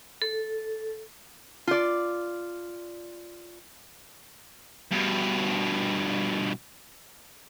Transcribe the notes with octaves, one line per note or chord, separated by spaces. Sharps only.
A4
F4 D5
G2 B2